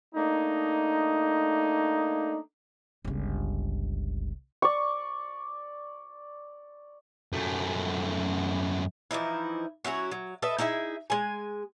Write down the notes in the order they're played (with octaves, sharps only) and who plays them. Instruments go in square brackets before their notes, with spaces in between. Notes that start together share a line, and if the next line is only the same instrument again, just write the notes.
[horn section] A3 A#3 D4 D#4
[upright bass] G1 C#2
[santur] D5 C#6
[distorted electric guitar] F#2 A3
[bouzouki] E3 F3 D#4 E4
F#3 C#4 E4 F#4
F#3
A4 B4 D#5 E5
D#4 E4 G#4 E5
G#3 G#5